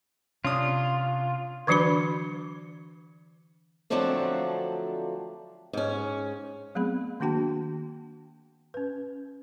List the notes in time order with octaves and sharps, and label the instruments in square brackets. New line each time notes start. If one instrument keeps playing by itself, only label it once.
[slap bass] C3 [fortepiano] C#4 D4 D#6 [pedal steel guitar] F4
[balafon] D3 E3 F#3 D4 F#4 B5
[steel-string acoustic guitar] D3 F3 F#3 A3 C4 D4
G#2 C#4
[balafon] F#3 A3 B3 C4 G#4 B5
D#3 A#3 D4 F#4 G5 A5
C#4 B4